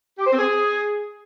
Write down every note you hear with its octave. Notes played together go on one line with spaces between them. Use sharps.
G4
C5
C4
G#4